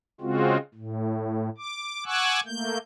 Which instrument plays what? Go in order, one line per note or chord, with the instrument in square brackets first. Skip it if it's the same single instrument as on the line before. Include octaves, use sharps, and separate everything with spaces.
[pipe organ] C#3 G#3 C4 F4 F#4
A2
D6
F#5 G#5 C#6 D6 E6 F#6
A3 A#3 G6